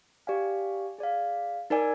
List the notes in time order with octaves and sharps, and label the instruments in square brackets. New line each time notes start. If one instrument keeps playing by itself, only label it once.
[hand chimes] G4 D5 F5 G#5
G#4 D5 F5
D#4 A#4 D5 G#5